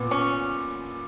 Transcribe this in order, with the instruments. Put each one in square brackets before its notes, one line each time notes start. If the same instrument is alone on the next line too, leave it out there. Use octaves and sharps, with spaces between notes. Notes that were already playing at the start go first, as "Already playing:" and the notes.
Already playing: [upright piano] A#2 B3
[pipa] C#4